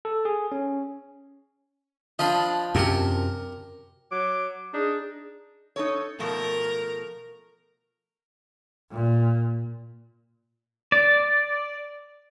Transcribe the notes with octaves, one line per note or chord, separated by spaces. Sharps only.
A4
G#4
C#4
F3 D4 D#5 F5 B5
F#2 C3 G4 A#4
F#3 D6
D4 D#4 G#4
D#4 A4 C#5
B2 F3 A3 A#4
A#2
D5